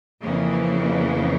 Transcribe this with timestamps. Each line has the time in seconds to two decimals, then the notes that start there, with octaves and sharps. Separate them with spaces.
0.21 F2 C#3 E3 A#3